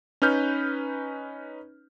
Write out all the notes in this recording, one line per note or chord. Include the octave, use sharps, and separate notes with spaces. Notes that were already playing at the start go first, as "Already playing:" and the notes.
C#4 D#4 B4 F6 G6